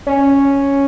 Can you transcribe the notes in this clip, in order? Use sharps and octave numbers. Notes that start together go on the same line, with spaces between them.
C#4